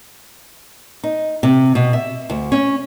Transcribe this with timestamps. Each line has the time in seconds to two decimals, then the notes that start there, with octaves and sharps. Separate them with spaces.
1.04 D#4
1.43 C3
1.75 B2
1.93 E5
2.30 D2
2.52 C#4